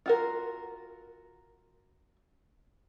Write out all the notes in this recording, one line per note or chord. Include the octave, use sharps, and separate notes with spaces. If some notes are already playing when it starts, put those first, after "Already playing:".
F4 F#4 A#4